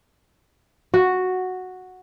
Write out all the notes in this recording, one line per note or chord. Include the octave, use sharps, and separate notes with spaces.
F#4